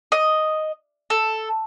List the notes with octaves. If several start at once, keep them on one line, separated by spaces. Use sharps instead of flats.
D#5
A4